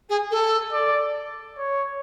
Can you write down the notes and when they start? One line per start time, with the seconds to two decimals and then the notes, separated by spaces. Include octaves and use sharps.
0.09 G#4
0.31 A4
0.73 D5
1.58 C#5